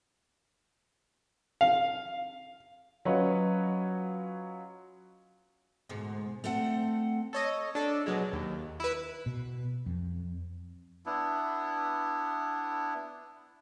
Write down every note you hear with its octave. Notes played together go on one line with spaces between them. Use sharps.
F5
F#3 C#4 F4 B4 C#5 D#5
D2 G#2 B2 G#3
A3 C4 A4 F#5
A4 C#5 D#5
D4 A4
B2 F#3 G#3
D#2
E4 B4
B2
F2
B3 D4 E4